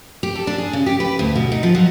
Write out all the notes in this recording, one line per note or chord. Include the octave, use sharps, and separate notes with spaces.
G4
A4
D4
G#4
C#3
G4
B4
D2
B2
D#4
F3
F#3